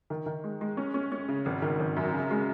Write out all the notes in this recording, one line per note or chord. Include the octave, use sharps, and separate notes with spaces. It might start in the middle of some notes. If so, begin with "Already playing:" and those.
D#3
D#3
G#3
G#3
C#4
C#4
C#4
C#3
G#1
D#3
G#1
F#2
C#3
G#3